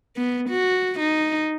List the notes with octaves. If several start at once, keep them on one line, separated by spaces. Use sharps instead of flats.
B3
F#4
D#4